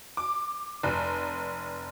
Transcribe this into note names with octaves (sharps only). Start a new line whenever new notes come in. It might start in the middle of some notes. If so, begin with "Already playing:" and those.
D6
F1